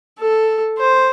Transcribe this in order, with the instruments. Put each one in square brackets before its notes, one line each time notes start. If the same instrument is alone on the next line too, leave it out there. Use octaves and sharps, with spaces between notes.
[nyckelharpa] A4
C5